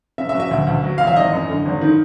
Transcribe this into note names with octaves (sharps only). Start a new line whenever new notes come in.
C#3 E5
E5
F#3
E5
D2
D2
F#3
A1 F5
E5
G#1 D#5
F#2
D3
G#1
D#3